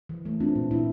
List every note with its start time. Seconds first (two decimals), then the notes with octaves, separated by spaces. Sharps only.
0.09 E3
0.25 A3
0.40 C4 D4 F4
0.55 A#2
0.71 A#2 E4